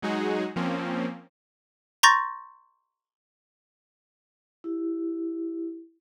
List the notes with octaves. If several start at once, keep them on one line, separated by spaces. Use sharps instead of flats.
F#3 G#3 D#4 F#4 G#4
F3 A#3 C4 C#4
A#5 C6 C#6 G6 A6 A#6
E4 G4